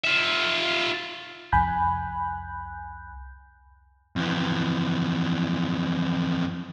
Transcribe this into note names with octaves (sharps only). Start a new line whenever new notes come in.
F4 E5
C2 F2 G#5 B5 F#6 G6
F2 E3